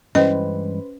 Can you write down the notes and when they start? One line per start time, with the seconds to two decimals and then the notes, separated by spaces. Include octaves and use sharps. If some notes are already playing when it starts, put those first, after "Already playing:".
0.15 G2 E3 G#3 C#4 B4 C5 D#5